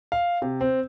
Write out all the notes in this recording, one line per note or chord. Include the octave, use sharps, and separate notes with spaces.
F5
C3
C4